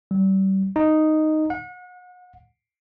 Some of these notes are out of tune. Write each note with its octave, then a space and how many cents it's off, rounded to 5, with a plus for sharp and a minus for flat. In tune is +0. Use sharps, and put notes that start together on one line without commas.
G3 -30
D#4 -5
F#5 -35